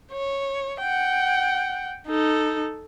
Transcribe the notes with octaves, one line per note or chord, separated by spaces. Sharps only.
C#5
F#5 G5
D#4 A4